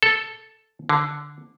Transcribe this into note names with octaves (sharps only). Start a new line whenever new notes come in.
A4
D3